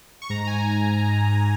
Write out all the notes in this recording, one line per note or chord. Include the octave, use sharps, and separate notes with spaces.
C#6
G#2 A#5
G#5